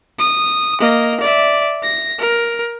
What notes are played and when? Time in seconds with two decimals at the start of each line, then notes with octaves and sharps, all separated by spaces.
0.18 D#6
0.80 A#3 D#5
1.21 D5 E5
1.83 A#6
2.19 A#4